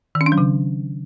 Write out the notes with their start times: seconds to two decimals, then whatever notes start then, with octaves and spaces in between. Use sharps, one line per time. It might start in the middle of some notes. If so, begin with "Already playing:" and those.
0.15 D#3
0.21 C#4
0.26 D4
0.32 F#3
0.38 C#3